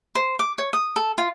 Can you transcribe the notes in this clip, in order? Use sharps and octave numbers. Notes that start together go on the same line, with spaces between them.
C5
D6
C#5
D#6
A4
F4